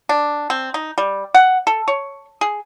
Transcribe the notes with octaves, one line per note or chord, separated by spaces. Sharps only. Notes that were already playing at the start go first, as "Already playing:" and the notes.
D4
C4
D#4
G3
F#5
A4
C#5
G#4